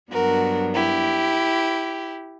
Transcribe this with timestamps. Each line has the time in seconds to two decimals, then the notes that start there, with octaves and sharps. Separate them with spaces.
0.11 G2 F#3 B3 D4 F#4 A#4
0.74 E4 G4